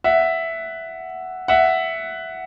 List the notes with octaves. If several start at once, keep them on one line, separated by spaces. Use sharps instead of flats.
E5 F#5
E5 F#5